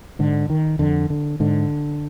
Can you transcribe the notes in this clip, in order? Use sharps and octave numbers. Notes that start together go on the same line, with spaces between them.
G#2 D3
D#3
F2 D3
D3
G#2 D3